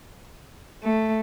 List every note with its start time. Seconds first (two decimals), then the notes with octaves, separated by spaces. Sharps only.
0.83 A3